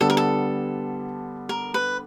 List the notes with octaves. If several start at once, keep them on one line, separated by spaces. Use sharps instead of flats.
D3 G3 B3 A4
A#4
A4
A#4
B4